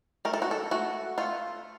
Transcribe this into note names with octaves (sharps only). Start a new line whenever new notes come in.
A3 A#4
A4
F#4
A4
A3 F#4
A3 F4